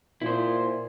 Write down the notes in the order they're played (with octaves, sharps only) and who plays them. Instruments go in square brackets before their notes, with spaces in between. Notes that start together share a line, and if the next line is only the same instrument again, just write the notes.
[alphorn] A#2 [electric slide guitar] E4 C5